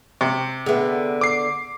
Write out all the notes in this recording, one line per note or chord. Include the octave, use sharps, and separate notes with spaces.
C3
D3 B3 G#4 E5
D6 E6 C7